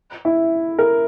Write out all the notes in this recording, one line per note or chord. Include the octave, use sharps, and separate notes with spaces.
E4
A#4